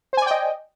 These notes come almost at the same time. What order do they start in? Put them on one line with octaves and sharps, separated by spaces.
C5 G#5 D5 G5 D#5